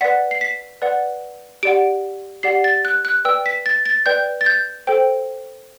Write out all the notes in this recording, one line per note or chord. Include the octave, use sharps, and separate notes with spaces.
B4 D5 F#5 B6
C7
B6
B4 D5 F#5
G4 D5 F#5 D7
G4 D5 F#5 C7
A6
F#6
F#6
B4 D5 G5 E6
B6
A6
A6
B4 D5 G5 G6
A6
G6
A4 C5 G5